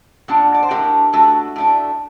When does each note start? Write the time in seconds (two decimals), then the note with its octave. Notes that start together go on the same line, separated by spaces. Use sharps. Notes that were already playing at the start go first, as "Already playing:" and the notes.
0.28 A#2 G3 D4 F#5 A5
0.54 D5
0.63 C5
0.70 A2 A3 D4 G4 A#4
1.13 A2 A3 D4 F#4 A4
1.56 A2 A3 D4